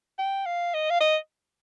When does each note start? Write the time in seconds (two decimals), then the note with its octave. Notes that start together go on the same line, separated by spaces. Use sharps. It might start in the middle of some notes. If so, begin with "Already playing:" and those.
0.19 G5
0.46 F5
0.74 D#5
0.90 F5
1.01 D#5